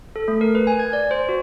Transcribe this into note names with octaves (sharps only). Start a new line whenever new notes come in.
A4
A3
A#4
B4
G#5
G#6
D5
C5
F#4